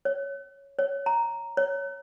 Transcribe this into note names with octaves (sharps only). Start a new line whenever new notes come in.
C#5
C#5
A#5
C#5